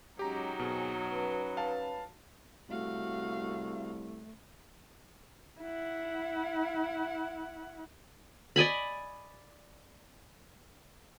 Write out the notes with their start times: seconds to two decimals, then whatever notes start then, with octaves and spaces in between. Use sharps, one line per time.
0.19 F#3 G#3 C#4 D#4 G4 A#5
0.59 B2 C4 G#4
1.08 C#4 B4
1.57 F5 A5
2.69 C2 A3 F#4 F5
5.61 E4 F#5
8.56 D5 D#5 G#5 B5